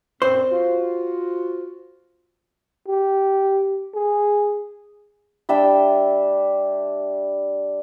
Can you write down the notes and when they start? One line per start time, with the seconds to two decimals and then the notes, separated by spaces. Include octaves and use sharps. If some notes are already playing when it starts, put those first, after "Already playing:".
0.22 F#2 A#2 C4 C5
0.49 F4 F#4
2.88 G4
3.95 G#4
5.49 G3 D4 E5 G5